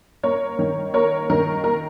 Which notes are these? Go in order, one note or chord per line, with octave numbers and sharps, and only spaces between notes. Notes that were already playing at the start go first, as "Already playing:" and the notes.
A#3 A#4 C#5
D#3
A#3 A#4 C#5
D#3 A#4
A#3 A#4